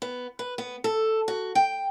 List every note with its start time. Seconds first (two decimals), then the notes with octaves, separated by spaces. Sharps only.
0.02 B3
0.39 B4
0.58 B3
0.84 A4
1.28 F#4
1.55 G5